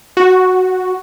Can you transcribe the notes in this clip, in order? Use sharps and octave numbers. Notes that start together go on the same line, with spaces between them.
F#4